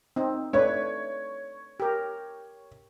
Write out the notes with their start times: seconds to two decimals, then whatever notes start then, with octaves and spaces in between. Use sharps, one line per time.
0.16 C4 D#4
0.53 A3 D4 B4 C#5
1.80 G4 A#4